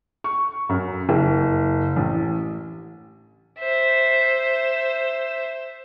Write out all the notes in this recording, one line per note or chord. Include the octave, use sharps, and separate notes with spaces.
C#6
F#2
F#1
A1
C5 E5